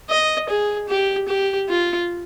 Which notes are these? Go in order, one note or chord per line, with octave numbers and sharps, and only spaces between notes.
D#5
G#4
G4
G4
F4